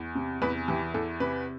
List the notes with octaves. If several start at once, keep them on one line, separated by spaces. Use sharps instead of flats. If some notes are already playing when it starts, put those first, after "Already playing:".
Already playing: E2
C3
E2 B4
E3 G4
E2 A4
C3 B4